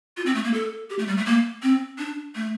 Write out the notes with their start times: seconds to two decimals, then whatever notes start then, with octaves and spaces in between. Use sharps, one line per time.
0.17 F4
0.26 C4
0.35 A3
0.44 A#3
0.54 A4
0.90 G4
0.99 A3
1.08 G3
1.17 A3
1.26 A#3
1.63 C4
1.98 D4
2.35 A3